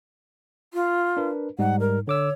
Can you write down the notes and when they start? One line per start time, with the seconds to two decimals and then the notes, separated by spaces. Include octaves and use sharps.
0.74 F4
1.17 D4 A#4 B4
1.59 G#2 G3 D#4 F#5
1.80 A#4
2.08 D3 C#5 D6 E6